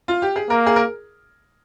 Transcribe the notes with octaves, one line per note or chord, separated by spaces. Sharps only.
F4
G4
G#4
A#3 A#4
G#4
A#4